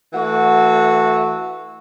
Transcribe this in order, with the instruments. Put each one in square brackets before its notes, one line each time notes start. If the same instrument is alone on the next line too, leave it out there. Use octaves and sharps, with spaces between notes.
[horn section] E3 A3 F#4